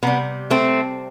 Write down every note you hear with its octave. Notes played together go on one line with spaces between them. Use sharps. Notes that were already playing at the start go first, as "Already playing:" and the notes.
C3 G3 B3
A3 C4